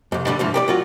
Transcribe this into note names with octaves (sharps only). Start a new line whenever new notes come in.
C2 F2
G2 D3 G3
G#2 E3 F3
G4 A#4 D5
F#3 F4 F#4